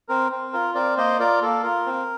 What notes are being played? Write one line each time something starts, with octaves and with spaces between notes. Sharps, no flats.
C4 A#4
C4
F4 A#4
C4 A#4 D5
A#3 C5 D#5
F4 A#4 D5
A#3 A4
F4 A#4
C4